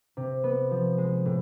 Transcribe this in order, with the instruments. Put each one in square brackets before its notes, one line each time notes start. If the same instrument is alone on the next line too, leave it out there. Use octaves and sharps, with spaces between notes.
[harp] C3
B3
F3
G#3
A2